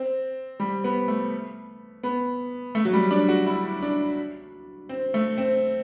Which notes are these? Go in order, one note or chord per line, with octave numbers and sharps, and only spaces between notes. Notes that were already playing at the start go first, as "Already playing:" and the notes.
Already playing: C4
G3
B3
A3
B3
A3
F#3
G3
D4
F#4
E4
D4
C4
A3
C4